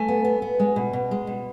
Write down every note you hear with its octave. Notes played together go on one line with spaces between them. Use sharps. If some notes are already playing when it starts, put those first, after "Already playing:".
Already playing: A3 G#5
B3
B3
B3
G#3
B2
B2
G#3
B2